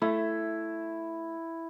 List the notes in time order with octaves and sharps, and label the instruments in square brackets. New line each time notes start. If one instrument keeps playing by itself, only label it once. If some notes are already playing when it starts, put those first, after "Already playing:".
[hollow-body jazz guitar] A3 [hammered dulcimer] E4